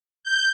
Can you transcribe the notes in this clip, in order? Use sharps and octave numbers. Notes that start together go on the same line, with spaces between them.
G6